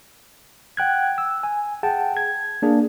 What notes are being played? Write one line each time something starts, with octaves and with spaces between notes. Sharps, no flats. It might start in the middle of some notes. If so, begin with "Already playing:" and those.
F#5 G5 F#6 G#6
E6
G#5
G#4 F#5 G5 A5
G#6
A#3 D4 G#4 A#4